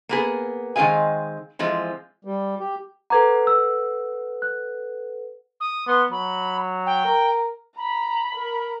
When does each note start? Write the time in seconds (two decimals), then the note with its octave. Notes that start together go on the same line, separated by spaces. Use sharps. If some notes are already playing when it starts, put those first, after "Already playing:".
0.09 A#3 B3 G#4
0.76 D#3 G#3 C4 G#4 F5 G#5
1.59 E3 F3 G#3 C4
2.25 G3
2.59 G4
3.10 A4 B4 F#5 A#5 D6 G#6
3.47 E6
4.42 F#6
5.60 D#6
5.87 B3 C6
6.11 F#3 B5
6.86 G5
7.05 A#4
7.77 A#5 B5
8.35 A#4